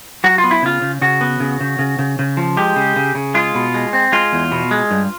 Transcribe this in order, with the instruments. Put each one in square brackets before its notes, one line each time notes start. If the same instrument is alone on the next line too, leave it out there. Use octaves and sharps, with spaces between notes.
[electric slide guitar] F#3 F#4
F4
B3
E4
C#3 F4
C#3
C#3 F#4
B3
C#3
C#3
C#3
C#3
C#3
F3
G#3 G4
C#3
C#3
C#3
G#3 F4
B2
G#3
C4
G#3 F4
E2
B2
G#3
G2